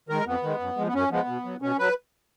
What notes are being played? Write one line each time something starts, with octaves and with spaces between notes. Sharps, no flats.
D#3 G#3 A#4
F2 B3
D#3 G#3
F#2
F3 G#3
B3
F#2 C#4
F3 G#3 B3
B2
F#3
B2 C#4
F#3 B4